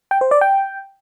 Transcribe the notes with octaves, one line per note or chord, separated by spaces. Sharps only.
G5
C5
D5
G5